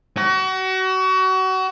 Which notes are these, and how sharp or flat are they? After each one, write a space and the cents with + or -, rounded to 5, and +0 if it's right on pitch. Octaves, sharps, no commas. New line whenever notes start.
F#4 +30